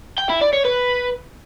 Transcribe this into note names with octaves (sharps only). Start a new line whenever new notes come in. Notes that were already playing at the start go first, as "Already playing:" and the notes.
G5
E4
D5
C#5
B4